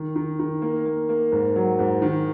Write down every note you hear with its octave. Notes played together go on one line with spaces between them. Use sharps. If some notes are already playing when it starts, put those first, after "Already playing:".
Already playing: D#3
D#3
D#3
A#3
A#3
A#3
G#2
F#3
G#2
D#3